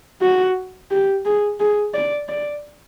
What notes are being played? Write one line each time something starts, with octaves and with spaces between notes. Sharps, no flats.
F#4
G4
G#4
G#4
D5
D5